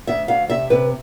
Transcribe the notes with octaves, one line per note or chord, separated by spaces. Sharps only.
D2 E5
D2 F5
C3 E5
C3 B4